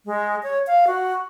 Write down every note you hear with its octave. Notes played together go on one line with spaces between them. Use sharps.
G#3
C#5
F5
F#4